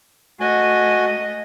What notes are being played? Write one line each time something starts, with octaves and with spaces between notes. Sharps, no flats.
A3 F#4 D#5 G#5